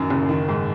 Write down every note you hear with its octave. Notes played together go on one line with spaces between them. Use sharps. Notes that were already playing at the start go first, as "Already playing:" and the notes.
Already playing: A1 F#2 D#3
F#1
D#3
G#2